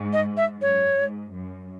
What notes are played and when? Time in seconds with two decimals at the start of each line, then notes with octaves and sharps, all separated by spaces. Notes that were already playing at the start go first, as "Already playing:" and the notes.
Already playing: G#2
0.13 D#5
0.37 E5
0.61 F#2 C#5
0.97 G#2
1.34 F#2